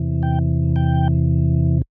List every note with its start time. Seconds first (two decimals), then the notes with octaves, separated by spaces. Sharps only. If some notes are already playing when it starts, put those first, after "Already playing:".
Already playing: E2 C3 E3
0.23 G5
0.76 G5